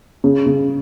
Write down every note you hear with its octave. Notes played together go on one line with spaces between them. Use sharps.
C#3
C#3